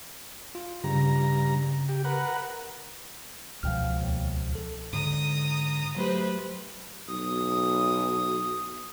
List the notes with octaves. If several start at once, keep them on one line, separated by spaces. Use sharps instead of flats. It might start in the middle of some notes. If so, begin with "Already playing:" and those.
F4
G2 C#3 A#5
G4
A#4 B4 F#5
C#2 B2 F3 F5 G5 F6
D#2
A4
G#2 D3 A#5 D#6
F#3 A3 G4 B4 C5
B1 D#6